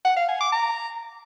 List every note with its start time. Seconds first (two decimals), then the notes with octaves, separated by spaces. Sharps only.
0.05 F#5
0.17 F5
0.29 G#5
0.41 D6
0.52 A#5